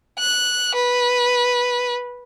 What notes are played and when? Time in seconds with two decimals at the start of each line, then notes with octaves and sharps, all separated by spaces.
0.19 F#6
0.75 B4